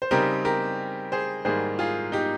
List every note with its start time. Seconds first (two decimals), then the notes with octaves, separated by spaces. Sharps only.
0.02 C5
0.11 C#3 G3 C4 D#4 G4 A#4
0.45 G4 A#4
1.12 G#4 C5
1.45 G#2 D#3 G3 A#3 G#4 C5
1.79 F4 G#4
2.12 D#4 G4